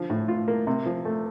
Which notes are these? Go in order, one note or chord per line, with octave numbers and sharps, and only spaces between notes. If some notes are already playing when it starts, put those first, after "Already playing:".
Already playing: D3 F3
A2
F4
A#3
C3
F3
A3